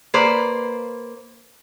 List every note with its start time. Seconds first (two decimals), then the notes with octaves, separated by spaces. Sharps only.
0.14 A#3 B4 C5 D5